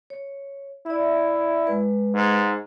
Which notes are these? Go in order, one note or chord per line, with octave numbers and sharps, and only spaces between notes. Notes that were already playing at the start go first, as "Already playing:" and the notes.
C#5
E4 D5 E5
G#3 B4
G#2